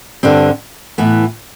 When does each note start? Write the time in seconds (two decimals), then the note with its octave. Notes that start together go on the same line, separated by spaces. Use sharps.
0.23 G2 D3 G3 C4
0.98 A2 E3 B3